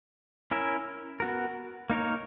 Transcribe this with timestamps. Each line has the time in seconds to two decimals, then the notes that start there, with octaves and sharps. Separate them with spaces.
0.51 C#4 E4 A#4 E5
1.20 B3 F#4 A#4
1.90 A#3 D#4 A#4 C#5